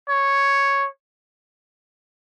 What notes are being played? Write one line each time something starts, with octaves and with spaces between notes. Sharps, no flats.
C#5